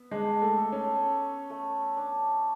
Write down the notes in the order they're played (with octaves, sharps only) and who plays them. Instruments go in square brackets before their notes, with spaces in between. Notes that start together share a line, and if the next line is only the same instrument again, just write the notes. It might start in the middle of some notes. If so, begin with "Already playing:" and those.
Already playing: [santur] B3 E5
[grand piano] G#3 [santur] D4
[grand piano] A3
[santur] A4
[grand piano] C#4
[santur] C#5
A3
D4